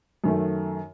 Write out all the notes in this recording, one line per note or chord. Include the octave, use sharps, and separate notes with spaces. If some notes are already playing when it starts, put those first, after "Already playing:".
F#2 D#3 A3